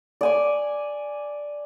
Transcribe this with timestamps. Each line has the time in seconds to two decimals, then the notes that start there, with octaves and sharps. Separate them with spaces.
0.21 D5 G#5 D6